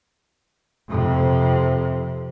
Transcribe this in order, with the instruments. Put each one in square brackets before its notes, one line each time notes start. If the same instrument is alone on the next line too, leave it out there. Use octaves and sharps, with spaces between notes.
[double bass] F2 C3